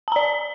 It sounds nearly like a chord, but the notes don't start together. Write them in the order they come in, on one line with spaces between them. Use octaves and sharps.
A5 A#5 D5